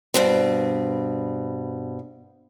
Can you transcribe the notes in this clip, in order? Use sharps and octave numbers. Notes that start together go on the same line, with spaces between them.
G2 B2 C4